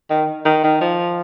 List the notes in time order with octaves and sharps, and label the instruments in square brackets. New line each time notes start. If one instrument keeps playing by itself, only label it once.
[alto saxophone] D#3
D#3
D#3
F3